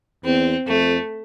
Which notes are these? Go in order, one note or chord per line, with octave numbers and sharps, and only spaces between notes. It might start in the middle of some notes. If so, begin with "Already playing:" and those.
E2 C4
F2 A3